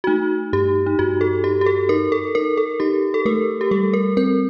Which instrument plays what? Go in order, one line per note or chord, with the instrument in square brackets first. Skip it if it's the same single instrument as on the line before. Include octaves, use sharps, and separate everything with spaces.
[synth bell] F#4
[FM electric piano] A3 [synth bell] D#4
[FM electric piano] G2 [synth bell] G4
[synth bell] D#4
[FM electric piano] G2 [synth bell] F#4
[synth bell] A4
[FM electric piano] D#4 [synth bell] G4
[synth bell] G4
A4
[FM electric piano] D#4 [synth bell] A#4
[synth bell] A4
[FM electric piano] D#4 [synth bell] A#4
[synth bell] A4
[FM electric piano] D#4 [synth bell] G4
[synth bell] A4
[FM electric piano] A3 [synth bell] A#4
[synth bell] G4
[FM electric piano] G3 [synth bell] A4
[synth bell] A#4
[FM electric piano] C4 [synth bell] A#4